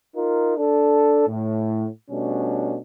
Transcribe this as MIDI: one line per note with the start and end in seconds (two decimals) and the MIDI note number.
0.16 0.54 63
0.16 0.54 65
0.16 0.54 70
0.58 1.24 62
0.58 1.24 69
1.28 1.86 45
2.11 2.78 47
2.11 2.78 55
2.11 2.78 57
2.11 2.78 61
2.11 2.78 62